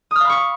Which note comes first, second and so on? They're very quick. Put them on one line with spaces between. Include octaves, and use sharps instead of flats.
D#6 F6 F5 B5 C#6